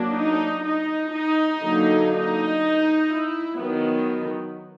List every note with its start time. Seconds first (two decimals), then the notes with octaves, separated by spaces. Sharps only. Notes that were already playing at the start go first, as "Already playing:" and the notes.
Already playing: F#3 A#3 D4
0.15 D#4
0.64 D#4
1.13 D#4
1.62 D3 F#3 A#3
2.12 D#4
3.10 E4
3.59 D#3 F#3 B3